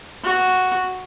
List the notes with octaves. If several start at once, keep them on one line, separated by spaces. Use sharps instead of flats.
F#4